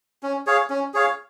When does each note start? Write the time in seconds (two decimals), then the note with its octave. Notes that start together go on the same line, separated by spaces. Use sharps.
0.23 C#4
0.47 G#4 C#5 F5
0.70 C#4
0.94 G#4 C#5 F5